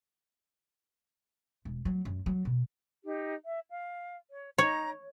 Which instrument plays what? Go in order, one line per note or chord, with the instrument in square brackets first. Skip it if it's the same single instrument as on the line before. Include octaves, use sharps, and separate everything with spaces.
[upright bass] E1
F#3
F#2
F#3
B2
[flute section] D#4 G4
E5
F5
C#5
[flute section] D#4 A#5 [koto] C#5